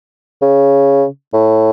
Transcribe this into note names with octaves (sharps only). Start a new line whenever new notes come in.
C#3
A2